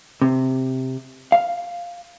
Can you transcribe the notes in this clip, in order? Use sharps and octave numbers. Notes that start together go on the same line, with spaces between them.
C3
F5